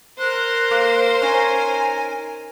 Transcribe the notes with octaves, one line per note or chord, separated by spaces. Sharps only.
A#4 C5 F#6
A#3
C#4 D#4 G#5